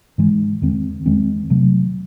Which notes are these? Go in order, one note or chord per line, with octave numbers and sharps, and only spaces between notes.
G#2 E3 G#3
E2 D#3 G#3 C4
E2 D#3 G#3 C4
C3 F#3 A3